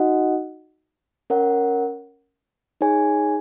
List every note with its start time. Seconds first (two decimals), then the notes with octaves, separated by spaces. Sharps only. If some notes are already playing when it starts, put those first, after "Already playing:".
Already playing: D#4 F#4 D#5 F#5
1.30 C#4 A#4 C#5 F#5
2.81 D#4 G#4 C#5 G#5